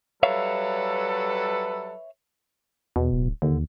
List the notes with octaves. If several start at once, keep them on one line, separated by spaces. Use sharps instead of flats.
F#3 G3 A4 B4 C#5 E5 F5
E2 B2
D1
D#2 D3